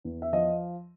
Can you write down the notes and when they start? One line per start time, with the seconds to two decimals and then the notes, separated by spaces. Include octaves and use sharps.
0.04 E2
0.22 E5
0.33 F3 D#5